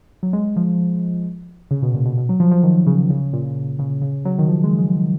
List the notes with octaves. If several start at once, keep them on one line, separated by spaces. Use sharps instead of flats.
F#3
G#3
F3
C#3
B2
A#2
B2
B2
F#3
F3
F3
D#3
C#3
C#3
A#2
C#3
C#3
F#3
D#3
F3
G#3
G#3